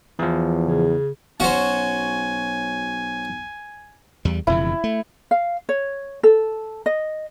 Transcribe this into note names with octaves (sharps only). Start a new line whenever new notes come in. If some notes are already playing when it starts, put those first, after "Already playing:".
E2 E3 F3
C#3
B1 C#4 F#4 C5 C#5 G#5
E2 G3
E1 F2 C#3 E4
A3
F5
C#5
A4
D#5